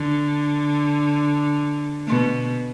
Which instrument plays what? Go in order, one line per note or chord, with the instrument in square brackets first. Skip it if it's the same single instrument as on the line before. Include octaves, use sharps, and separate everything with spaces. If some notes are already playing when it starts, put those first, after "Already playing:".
Already playing: [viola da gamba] D3
B2